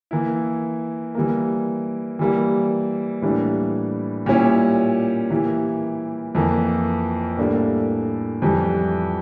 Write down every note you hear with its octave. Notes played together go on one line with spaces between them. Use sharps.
E3 A#3 E4
E3 G3 A#3
E3 G3 A#3
A2 E3 G3 A#3 D4
A#2 G3 C#4 E4 G4
E3 A#3 E4 G4
F2 E3 A#3
A2 G3 A#3 D4 A4
F2 E3 G3